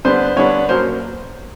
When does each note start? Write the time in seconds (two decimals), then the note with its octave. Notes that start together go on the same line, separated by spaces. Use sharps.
0.05 D3 G3 B3 D4 C5
0.36 D3 G3 B3 D4 C#5
0.69 B2 F#3 A#3 C#4 C5